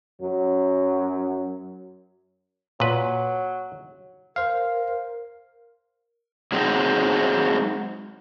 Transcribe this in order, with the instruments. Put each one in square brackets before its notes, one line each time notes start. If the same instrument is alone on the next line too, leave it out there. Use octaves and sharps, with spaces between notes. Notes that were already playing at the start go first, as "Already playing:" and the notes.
[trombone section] F#2 F#3
[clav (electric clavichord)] A#2 B4 [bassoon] F#3
[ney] A#4 [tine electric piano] C5 F5
[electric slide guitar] F#3 G#3 C4 D#4